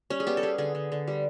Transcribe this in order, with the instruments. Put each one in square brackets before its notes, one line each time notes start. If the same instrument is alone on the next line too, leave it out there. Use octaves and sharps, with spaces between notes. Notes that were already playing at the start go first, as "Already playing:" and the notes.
[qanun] G3 C#4
G#4
B3 G4
A4
B3 G#4
D3 G#4
D3
D3
G3